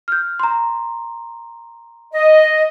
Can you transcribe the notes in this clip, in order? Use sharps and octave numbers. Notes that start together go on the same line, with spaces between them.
F6 G6
A#5 C6
D#5